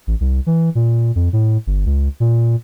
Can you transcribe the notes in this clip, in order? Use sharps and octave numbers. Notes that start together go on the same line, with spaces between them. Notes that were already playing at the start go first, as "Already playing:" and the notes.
A1
C2
E3
A#2
F2
A2
G1
C#2
A#2